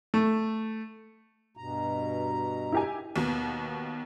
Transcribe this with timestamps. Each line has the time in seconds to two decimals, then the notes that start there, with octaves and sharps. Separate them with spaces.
0.14 A3
1.57 G2 B2 A#5
2.72 E4 G4 G#5
3.16 D#2 B2